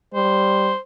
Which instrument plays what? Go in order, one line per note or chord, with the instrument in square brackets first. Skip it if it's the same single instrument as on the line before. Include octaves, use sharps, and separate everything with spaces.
[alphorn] G3 [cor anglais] C5